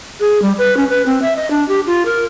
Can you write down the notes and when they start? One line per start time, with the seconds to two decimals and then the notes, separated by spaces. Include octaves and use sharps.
0.20 G#4
0.42 G3
0.58 B4
0.77 C#4
0.90 B4
1.06 C4
1.22 E5
1.36 D#5
1.51 D4
1.68 G4
1.87 F4
2.05 A#4